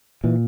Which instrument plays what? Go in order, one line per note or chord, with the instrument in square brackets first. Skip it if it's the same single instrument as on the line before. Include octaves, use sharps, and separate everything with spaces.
[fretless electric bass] A#2 E3